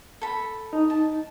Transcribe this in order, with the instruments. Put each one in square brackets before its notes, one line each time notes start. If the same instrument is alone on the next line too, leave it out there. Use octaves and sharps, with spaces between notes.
[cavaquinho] A4 B5
[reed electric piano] D#4
[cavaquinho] A5